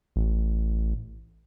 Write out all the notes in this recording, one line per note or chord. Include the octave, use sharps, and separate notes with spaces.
A1